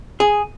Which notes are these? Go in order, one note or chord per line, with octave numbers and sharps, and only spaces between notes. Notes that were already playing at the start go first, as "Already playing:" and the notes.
G#4